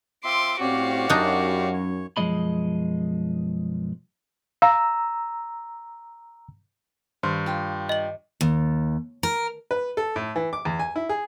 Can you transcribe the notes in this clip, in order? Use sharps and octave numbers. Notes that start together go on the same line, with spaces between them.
C4 F4 E5 C6 D6
A2 C4 C#4 F#4 G4 D5 F5
F#2 D4 D#4
C#5
B1 F#2 F3 G#3 D#5 B5
F5 A#5 E6
G2 D#3 F5
F4 G4 C6
D#5 F#7
D#2
A#4
B4
A4
A2
E3
D6
E2
G#5
E4
G#4